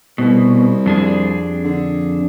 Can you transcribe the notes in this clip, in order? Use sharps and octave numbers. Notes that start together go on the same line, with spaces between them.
C2 B2
F2 D4 G#4
D3